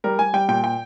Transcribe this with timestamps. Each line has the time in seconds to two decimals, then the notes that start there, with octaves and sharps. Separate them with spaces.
0.04 G3 A#4
0.19 G3 G#5
0.33 G3 G5
0.48 A#2 G5
0.64 G5